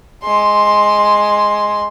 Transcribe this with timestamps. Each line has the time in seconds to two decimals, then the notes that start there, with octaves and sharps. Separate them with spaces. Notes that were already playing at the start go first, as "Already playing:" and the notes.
0.23 G#3 C6